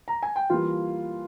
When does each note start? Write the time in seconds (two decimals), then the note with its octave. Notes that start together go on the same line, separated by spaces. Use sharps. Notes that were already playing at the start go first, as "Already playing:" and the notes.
0.08 A#5
0.23 G#5
0.36 G5
0.49 E3 G3 A#3 F4 F5